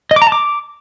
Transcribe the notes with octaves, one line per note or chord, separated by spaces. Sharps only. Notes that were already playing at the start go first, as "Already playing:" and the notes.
D#5
D6
A#5
A5
D6